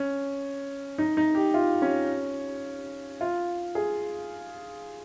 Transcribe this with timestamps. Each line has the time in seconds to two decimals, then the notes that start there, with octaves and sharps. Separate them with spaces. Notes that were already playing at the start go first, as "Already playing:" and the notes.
Already playing: C#4
0.98 D#4
1.17 D#4
1.35 G4
1.54 F4
1.82 C#4
3.21 F4
3.75 G#4